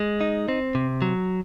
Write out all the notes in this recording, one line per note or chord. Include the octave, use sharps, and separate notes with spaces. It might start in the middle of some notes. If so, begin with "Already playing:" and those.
Already playing: G#3
D#4
C4
C3
F#3